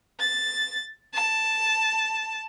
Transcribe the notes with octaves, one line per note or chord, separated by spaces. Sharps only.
A6
A5